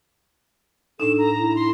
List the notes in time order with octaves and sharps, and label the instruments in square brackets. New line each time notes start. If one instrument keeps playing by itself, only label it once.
[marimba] A2 D4 D#4 [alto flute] A4 [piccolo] E7
[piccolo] A#5
[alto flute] E4
[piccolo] C6